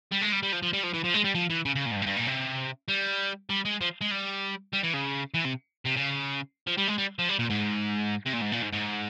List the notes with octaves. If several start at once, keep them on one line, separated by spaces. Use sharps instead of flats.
G3
G#3
G3
G3
F3
F3
G3
F3
E3
F3
G#3
G3
F3
E3
C#3
C#3
A#2
G#2
G2
G#2
G2
A#2
C3
G3
G3
G#3
F3
G#3
G3
G3
E3
C#3
E3
C3
C3
C#3
F3
G3
G#3
G3
F3
G3
A#2
G#2
C3
A#2
G#2
A#2
G#2
G#2